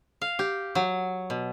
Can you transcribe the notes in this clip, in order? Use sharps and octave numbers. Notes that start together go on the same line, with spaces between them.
F5
G4
F#3
B2